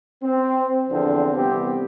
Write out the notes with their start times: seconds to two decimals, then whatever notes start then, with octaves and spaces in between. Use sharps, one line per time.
0.23 C4
0.89 E2 D3 F3 C4 D4
1.36 C2 E3 B3 C4 G4